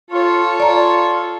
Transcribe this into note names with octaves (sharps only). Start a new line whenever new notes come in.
F4 A4 C#5
F4 D5 A#5